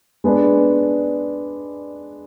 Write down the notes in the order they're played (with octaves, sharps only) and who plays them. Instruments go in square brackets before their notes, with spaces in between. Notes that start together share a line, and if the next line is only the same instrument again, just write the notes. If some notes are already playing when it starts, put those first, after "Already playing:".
[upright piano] G#3 B3 D4